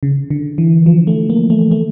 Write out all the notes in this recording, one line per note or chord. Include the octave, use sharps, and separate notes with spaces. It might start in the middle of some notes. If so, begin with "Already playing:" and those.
C#3
D3
E3
F3
A3
A#3
A3
A3